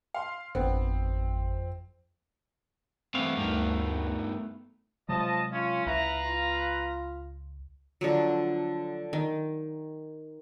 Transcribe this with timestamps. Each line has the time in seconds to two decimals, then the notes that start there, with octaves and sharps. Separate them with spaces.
0.14 F5 C6
0.55 G#1 F2 D3 B3 C4
3.15 C3 E3 A3 B3 F5
3.37 D2 G2 D#3
5.09 C3 F3 F#3 G#3 D#5 A5
5.52 C#4 F4
5.86 C#2 E4 B4 F5 A#5
6.26 F4
8.01 D3 F3 F#3
9.13 D#3